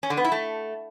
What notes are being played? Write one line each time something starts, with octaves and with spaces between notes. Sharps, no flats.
C#4
D3
B3
E4
A3